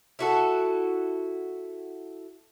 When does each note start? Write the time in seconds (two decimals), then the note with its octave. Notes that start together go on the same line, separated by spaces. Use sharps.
0.19 E4 F#4 A4